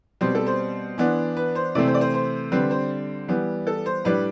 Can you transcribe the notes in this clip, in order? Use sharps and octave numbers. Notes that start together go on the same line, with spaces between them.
B2 G3 C4 C5
A4
C5
E3 B3 D4
B4
C5
C3 E3 A3 C4 D5
C5
D5
C5
C5
D3 G3 C4 B4
C5
E3 G3 B3
A4
C5
A2 G3 D4 B4